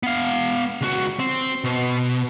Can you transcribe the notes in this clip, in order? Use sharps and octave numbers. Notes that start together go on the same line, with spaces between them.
B3 F5
C#2 F#4
C4
B2